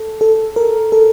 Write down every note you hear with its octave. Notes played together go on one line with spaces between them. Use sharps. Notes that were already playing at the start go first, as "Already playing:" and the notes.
Already playing: A4
A4
A#4
A4